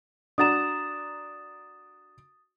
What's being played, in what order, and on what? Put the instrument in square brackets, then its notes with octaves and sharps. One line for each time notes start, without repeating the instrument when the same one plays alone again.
[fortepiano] D4 F#4 A#5 [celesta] D#6 A6 E7